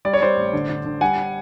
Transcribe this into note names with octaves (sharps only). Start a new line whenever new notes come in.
G3 D5
C#5
G3 C5 D5
A1
D3
D3
D3
G3 F#5 G#5